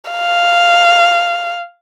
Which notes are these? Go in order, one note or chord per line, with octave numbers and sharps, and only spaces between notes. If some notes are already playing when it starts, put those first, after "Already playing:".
F5